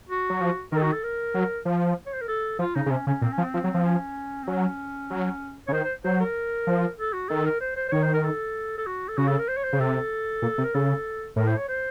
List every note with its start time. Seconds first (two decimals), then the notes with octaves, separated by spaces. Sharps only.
0.09 F#4
0.30 F#3
0.41 F3
0.72 D#3 A4 A#4
0.82 F#4
0.92 A4
1.03 A#4
1.34 F#3
1.65 F3
2.06 C#5
2.14 C5
2.21 A#4
2.28 A4
2.59 F3 F4
2.75 C#3 D#4
2.86 C#3
2.90 C3 C#4
3.07 C#3 C#4
3.22 A#2 C4
3.32 C#4
3.38 F3
3.43 C4
3.54 F3
3.64 F#3
3.74 F3
3.85 C#4
4.43 C4
4.47 F#3 C#4
5.10 F#3
5.67 C#3 C#5
5.72 D#3 C5
5.84 C5
6.04 F#3 C5
6.20 A#4
6.67 F3
6.99 A4
7.13 F#4
7.29 D#3 A4
7.45 A#4
7.61 C5
7.76 C5
7.88 C5
7.92 D#3 C#5
8.03 C5
8.13 A#4
8.24 A4
8.78 A4
8.86 F#4
9.08 A4
9.18 C#3 F#4
9.28 A4
9.39 A#4
9.48 C5
9.57 C#5
9.64 C5
9.73 C#3
9.80 C3 A4
10.42 A#2
10.58 C3
10.64 A#4
10.74 C#3 A4
11.36 A2 A#4
11.47 C5
11.58 C#5
11.68 C5